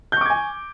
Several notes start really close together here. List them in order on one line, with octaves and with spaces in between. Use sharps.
G6 C#6 D6 G#6 G#5